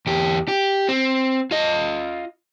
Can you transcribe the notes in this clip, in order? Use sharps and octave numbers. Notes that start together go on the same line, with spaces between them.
E2 G4
G4
C4
F4 D#5